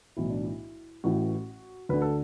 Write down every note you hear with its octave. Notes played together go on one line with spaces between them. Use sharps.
B1 A2 E3 E4
D4
E4
A1 A2 E3 F#4
D2 D3 B4
A4